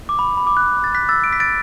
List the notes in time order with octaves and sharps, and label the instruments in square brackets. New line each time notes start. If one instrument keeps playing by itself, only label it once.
[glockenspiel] D6
B5
B5
D6
F#6
A6
F#6 B6
E6 A6
D7
B6
A6 D7